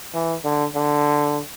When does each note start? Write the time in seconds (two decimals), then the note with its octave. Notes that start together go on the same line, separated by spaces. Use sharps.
0.14 E3
0.44 D3
0.75 D3